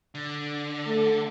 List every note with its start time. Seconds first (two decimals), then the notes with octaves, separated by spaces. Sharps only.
0.15 D3
0.87 A3